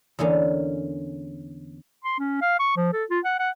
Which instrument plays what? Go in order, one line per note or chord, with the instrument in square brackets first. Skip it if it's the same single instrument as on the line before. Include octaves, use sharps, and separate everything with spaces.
[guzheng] E2 D3 A#3 C#4
[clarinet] C6
C#4
F5
C#6
F3
A4
F4
F#5
F#5